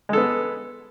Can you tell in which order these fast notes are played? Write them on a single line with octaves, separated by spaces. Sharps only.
G#3 A4 B3